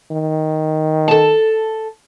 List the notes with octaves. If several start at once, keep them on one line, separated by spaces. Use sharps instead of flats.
D#3
A4 A5